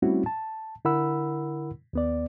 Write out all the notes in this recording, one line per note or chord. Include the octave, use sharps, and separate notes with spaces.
G3 A3 C4 C#4 E4 F#4
A5
D3 E4 A#4 F#5 B5 E6
D#2 B3 D5